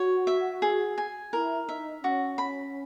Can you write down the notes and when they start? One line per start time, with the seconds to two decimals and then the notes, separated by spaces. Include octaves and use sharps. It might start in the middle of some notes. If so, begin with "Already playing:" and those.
Already playing: F#4 C#5
0.27 E5
0.62 G#4
0.98 G#5
1.33 E4 A#4
1.68 D#4 E5
2.04 C#4 F#4
2.38 B5